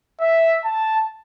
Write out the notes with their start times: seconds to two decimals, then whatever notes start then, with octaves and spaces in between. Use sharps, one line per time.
0.21 E5
0.65 A5